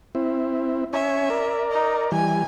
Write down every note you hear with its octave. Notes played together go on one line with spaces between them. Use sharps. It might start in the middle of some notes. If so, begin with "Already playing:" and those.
C4 E4
C#4 C#5 E5 G#5
A#4 D5
D#4
E3 G3 G#5